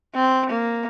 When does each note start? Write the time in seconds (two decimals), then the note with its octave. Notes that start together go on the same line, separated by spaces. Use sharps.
0.15 C4
0.50 A#3